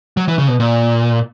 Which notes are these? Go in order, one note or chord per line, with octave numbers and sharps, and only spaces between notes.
F#3
E3
C#3
B2
A#2